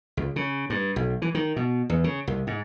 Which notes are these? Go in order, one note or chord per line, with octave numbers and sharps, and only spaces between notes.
C#2
C#3
G2
B1
E3
D#3
B2
E2
C#3
C2
G#2